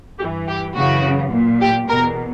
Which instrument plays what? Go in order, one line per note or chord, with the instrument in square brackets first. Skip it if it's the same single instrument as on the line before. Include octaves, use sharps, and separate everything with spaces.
[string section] G2 E3 G4
G4
F#2 C#3 E3 F#4
A#2
G4
E2 B2 A#4